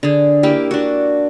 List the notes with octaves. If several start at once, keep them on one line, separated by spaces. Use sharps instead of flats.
D3 G#4
A#3 E4 G4
D4 F#4